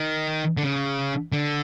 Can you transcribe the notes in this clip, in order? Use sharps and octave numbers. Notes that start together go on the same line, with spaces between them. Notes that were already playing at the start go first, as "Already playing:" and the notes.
Already playing: D#3
D3
C#3
D3